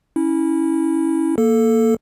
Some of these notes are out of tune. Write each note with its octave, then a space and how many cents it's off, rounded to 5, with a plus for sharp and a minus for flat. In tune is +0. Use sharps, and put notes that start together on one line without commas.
C#4 +0 E4 -20
A#3 +0 A4 +0